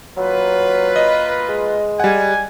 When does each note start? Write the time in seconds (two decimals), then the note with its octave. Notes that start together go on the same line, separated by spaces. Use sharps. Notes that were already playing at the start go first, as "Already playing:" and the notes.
0.17 F#3 A#3 F4 B4
0.96 D#5
1.49 G#3
2.00 G3 F#5 G#5